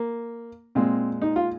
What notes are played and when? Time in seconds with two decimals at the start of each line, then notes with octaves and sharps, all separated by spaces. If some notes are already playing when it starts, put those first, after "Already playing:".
Already playing: A#3
0.75 A#2 G#3 C4
1.22 D#4
1.36 F4